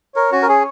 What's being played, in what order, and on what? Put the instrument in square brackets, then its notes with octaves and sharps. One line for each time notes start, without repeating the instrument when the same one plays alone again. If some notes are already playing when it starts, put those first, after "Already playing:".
[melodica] A#4 [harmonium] C#5
[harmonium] C#4 [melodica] F#4
[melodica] A#4
[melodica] G#4 [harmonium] C#5